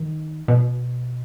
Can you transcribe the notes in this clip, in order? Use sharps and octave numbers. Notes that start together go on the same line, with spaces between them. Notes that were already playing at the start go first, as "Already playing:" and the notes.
Already playing: D#3
B2